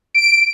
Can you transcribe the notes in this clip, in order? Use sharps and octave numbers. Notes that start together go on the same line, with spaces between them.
D7